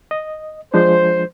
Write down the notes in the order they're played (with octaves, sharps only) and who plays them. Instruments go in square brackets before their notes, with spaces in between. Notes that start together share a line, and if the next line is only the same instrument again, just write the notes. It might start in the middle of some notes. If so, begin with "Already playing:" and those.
[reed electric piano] D#5
[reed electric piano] F3 G#3 D4 [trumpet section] C5